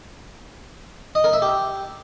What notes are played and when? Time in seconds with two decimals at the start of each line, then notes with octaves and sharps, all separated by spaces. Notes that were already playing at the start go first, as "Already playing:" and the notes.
1.15 D#5
1.24 A#4
1.33 E5
1.42 G4